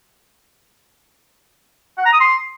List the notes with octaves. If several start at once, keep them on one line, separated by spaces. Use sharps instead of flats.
F#5
A#5
D#6
C6